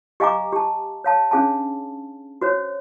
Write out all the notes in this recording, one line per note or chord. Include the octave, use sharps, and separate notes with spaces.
G4 D#5 F5 G#5 A#5 D6
G4 A5
C#5 F5 A5
C#4 D4 G#4 F5 G#5 A5
F#4 C5 C#5